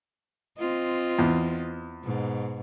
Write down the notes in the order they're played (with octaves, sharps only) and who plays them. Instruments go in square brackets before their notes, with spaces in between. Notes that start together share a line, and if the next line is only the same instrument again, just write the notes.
[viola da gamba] C4 F4 D#5
[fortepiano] E2
[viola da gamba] G#2 B2